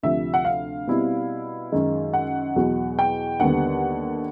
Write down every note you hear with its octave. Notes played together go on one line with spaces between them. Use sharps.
D2 C3 F3 E5
F#5
F5
B2 G3 C4 E4
F#2 D#3 G#3
F#5
E2 B2 F#3
G5
D#2 D3 G3 B3 F#5